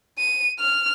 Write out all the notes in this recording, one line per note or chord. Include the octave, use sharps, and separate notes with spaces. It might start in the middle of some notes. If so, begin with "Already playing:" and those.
D#7
F6